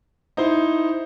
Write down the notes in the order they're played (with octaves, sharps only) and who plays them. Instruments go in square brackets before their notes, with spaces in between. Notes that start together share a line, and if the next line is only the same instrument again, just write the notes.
[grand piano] D#4 E4 C5